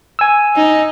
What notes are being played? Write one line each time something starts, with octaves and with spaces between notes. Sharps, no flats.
G#5 E6
D#4